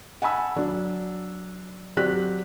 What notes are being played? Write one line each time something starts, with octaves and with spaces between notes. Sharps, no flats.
F#5 G#5 A5 B5 E6
F#3 D4
F#3 C4 G4 D5 F#6 B6